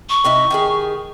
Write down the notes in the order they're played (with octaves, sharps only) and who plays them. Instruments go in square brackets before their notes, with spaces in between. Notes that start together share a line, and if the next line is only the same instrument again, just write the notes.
[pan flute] C#6
[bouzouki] C3 D#4 E4
D#3 G4 G#4